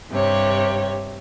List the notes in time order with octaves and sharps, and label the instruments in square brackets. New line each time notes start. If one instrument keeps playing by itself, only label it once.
[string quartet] G2 C3 G4 C#5